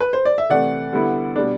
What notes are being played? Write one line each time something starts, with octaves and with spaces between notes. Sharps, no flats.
B4
C5
D5
E5
C3 E3 A3 D5 F#5
D3 G3 B3 E4
B2 G3 D4